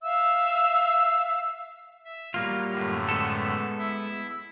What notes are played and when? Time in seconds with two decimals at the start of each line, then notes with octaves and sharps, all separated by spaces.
0.02 E5 F5 E6
2.04 E5
2.34 F#3 G3 A#3 F4
2.71 F#2 A2 D3
3.09 G#3 B3 A4
3.78 E4 E5